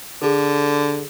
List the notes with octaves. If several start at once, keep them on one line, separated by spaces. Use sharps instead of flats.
D3 G#4 A4